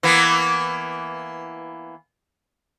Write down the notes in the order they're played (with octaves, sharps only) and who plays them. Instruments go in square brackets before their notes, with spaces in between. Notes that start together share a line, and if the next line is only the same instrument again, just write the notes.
[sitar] E3 A#3 B3